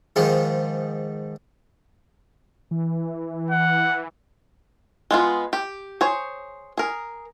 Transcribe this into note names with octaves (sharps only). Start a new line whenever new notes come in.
G#2 D#3 F3 G#3
E3
F#5
G#3 B3 F4
G4
G#4 C5 C#5
G#4 A#4